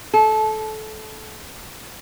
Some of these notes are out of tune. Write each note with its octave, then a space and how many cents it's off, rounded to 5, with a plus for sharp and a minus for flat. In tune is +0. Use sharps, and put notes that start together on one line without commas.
A4 -20